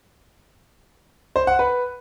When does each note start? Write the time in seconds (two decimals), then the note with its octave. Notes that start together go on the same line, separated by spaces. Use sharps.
1.36 C5
1.47 F#5
1.59 B4